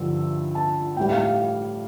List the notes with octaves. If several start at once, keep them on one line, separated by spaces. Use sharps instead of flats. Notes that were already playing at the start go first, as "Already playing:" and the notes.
Already playing: G2 D3 F3 E6
A5
A2 E3 G3 G5
F5